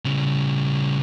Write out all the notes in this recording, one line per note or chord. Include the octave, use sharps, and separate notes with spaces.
C#3 G3